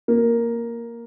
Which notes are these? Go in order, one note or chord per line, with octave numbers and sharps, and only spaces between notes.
A#3